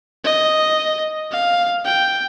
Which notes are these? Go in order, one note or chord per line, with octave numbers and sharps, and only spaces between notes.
D#5
F5
G5